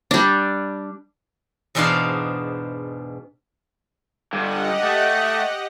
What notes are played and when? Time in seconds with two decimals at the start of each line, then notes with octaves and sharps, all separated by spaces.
0.11 G3 D4
1.75 E2 G#2 B2 D4 C5 F5
4.33 G2 D3 G4 D#5 F#5
4.83 A3